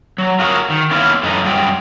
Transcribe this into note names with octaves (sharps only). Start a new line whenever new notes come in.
F#3
F4 F#4 G#4 A#4 C#5
D#3
A#3 B3 C#4 E4 F4
F#2 E3 G#3 A3 D#4
F#2 G3 F4 G#4 G5